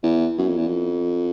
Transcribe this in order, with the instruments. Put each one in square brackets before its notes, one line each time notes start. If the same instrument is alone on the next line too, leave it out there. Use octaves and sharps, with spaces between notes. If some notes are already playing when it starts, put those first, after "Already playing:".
[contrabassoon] E2
F#2
F2
E2
F2